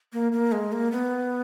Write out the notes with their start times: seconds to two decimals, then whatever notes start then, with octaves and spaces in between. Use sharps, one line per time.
0.13 A#3
0.32 A#3
0.52 G#3
0.72 A#3
0.92 B3